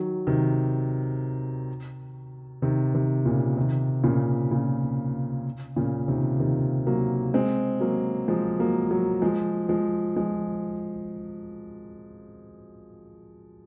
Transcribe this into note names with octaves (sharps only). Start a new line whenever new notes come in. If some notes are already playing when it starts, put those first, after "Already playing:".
Already playing: D#3 F#3
C3 D#3
C3 D#3
C3 D#3
A#2 C#3
C3 D#3
A#2 C#3
A#2 C#3
A#2 C#3
C3 D#3
C3 D#3
F#3 A#3
G#3 C4
F#3 A#3
F3 G#3
F#3 A#3
F#3 A#3
F3 G#3
F3 G#3
F3 G#3